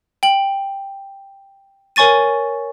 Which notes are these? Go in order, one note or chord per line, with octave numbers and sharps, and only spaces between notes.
G5 F#7
A#4 C#5 G#5 C#6 A6 D#7